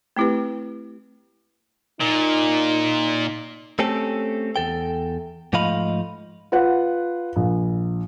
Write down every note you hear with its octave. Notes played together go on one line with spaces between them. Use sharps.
A3 C4 E4 G4 B4
A#2 D#4
A3 C4 C#4 G4 A4
E2 A4 G5
G#2 F3 A3 D#5 F5 B5
F4 B4 F#5
A#1